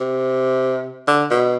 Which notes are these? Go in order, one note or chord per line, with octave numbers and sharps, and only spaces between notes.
C3
D3
B2